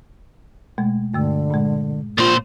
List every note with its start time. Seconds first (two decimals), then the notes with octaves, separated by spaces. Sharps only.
0.78 B2 G#3 A3
1.14 G2 D3 A3 E6
1.50 A#2 G#3
2.18 A#2 F4 C5